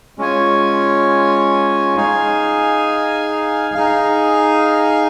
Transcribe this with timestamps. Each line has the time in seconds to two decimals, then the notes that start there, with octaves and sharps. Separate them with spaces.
0.18 G#3 C#4 F4 C#5 G#5
1.96 D#4 G#4 F5 G#5
3.75 D#4 G#4 F5